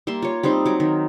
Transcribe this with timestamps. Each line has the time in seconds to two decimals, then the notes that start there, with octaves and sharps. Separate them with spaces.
0.07 G3 A#3 E5 C6
0.22 F4 C#5
0.43 G3 C4 D#4 C5
0.65 F#3 D6
0.80 D#3